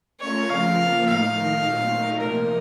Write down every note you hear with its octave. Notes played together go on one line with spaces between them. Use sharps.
A3 C#4 F4 A#4 C#5
C#3 F3 C4 F4 A#4 F5
F3 A#3 F4 A#4
A2 A3 D#4 F5
D#3 A3 D#4 A#4
A#2 F#3 C4
F#3 A3 D#4 A#4
C3 F3 A#3 D#4 A#4